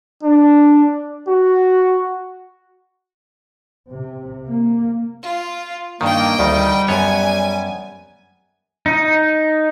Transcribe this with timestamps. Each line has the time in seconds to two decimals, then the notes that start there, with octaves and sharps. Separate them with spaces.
0.23 D4
1.28 F#4
3.91 C3
4.47 A#3
5.23 F4
6.01 G2 D#3 A#3 D#5 G5
6.39 D2 D#3 G3
6.88 F#2 B3 G4 C#5 G#5
8.86 D#4